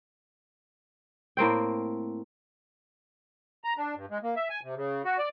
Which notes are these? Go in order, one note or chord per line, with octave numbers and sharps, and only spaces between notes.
A2 A#3 C4 G5
A#5
D4
G2
G#3
A#3
E5
G#5
C3
C#3
F#4
D5